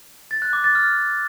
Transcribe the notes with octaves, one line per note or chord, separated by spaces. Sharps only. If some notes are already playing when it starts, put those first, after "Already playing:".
A6
F#6
D6
A6
F6